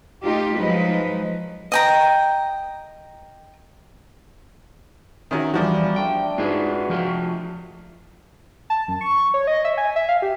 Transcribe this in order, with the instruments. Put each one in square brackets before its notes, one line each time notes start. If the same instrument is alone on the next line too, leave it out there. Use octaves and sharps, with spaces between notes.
[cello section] A3 D#4 F4 G4
F3 F#3 G#3 D#4 B4
[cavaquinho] D#5 G5 A#5
[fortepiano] D#3 C#4 F#4 [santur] E5 A#5
[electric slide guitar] E2 [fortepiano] F3 F#4 [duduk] G3 [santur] D5 G#5 A#5
[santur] A3 D4 [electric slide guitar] G5
[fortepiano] G#2 [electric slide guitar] F4 G#4 B4 [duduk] F#4
[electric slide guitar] F3 F4 G4
[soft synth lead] A5
F#2
C#6
C#5
D#5
E5
G#5
E5
F5
G4